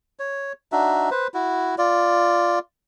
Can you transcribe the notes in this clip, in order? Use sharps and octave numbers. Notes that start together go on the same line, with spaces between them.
C#5
D4 D#4 F#4 E5
B4 C5
E4 F#4
F4 D5